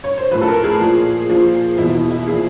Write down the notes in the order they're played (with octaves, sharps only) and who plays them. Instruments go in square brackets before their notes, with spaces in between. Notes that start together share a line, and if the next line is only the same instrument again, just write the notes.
[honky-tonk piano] C#5
C5
A2 F3 B4
A4
A#4
G#4
A#2 F3
A#2 F3
E2 B2 E4
E4
E4
A#2 F3 G#4